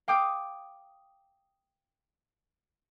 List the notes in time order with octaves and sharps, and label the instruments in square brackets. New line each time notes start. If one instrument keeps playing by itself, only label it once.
[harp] F5 G5 D6 D#6